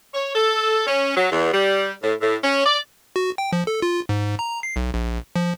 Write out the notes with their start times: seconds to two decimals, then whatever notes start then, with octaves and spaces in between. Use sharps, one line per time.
0.14 C#5
0.35 A4
0.86 C#4
1.17 F#3
1.31 E2
1.53 G3
2.03 A2
2.21 A2
2.44 C#4
2.65 D5
3.16 F#4
3.38 G5
3.53 F3
3.67 A4
3.82 F4
4.09 G#2
4.39 A#5
4.63 C7
4.76 B1
4.94 A#1
5.36 F3